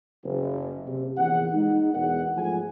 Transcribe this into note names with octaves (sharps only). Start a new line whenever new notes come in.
F#1
C3
A#1 E2 F#5
G#3 D#4
E2 B2 A#4 F#5
G#2 F3 A3 G#4 G#5